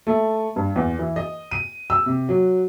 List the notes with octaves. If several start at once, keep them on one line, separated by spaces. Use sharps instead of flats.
A3
G2
E2
E3
D#5
D#7
E6
C3
F#3